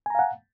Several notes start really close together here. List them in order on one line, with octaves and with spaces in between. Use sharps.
G#5 A#5 F5 F#5